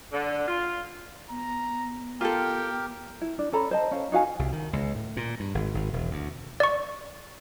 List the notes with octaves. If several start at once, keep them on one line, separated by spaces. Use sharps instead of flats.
D3
F4
B3 A#5
F4 G4 A4 A#4 G5
E4
D4
C#4 A4 A#5 B5
C5 D#5 A5
C#4 F5
D#4 F#4 F5 G#5
C2
D#3
C#2
A2
A#2
G2
G#1
G#1
E1
D2
D5 C#6